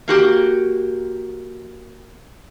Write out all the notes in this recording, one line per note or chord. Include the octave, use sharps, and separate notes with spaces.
A#3 F#4 G4